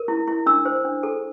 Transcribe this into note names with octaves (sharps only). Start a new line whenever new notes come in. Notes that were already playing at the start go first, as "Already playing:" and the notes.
Already playing: A#4
E4
E4
D4 E6
C5
D4
A4